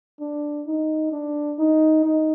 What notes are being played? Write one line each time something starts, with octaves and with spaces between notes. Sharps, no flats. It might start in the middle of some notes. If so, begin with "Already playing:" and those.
D4
D#4
D4
D#4
D#4